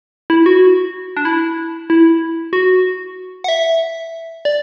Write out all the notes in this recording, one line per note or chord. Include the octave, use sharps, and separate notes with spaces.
E4
F#4
D4
E4
E4
F#4
F#5
E5
D5